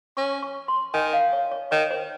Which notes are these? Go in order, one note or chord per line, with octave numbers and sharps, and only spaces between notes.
C#4 C#6
C#6
C6
D#3 G#5
F5
C#5
C#5
D#3 C#5
C5